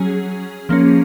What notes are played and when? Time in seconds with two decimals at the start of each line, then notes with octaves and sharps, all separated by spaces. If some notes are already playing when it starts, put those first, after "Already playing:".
Already playing: F#3 C#4 G#4
0.69 F3 A#3 C#4